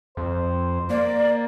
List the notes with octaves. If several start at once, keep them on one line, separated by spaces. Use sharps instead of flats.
F2 C5
A#3 D5